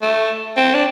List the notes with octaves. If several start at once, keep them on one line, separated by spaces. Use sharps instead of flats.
A3
C4
D4